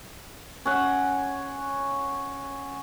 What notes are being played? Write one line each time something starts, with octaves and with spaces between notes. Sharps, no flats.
C#4 F#5